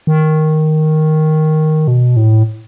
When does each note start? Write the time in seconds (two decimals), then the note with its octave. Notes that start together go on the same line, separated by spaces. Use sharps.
0.07 D#3
1.88 B2
2.17 A2